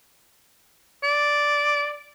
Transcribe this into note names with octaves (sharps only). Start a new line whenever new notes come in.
D5